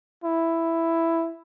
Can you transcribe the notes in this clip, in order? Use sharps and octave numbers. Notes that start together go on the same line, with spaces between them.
E4